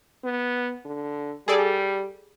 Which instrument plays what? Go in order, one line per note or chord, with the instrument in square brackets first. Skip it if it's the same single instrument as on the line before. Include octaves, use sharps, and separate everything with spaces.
[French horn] B3
D3
[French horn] G3 [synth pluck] G#4 A4 D5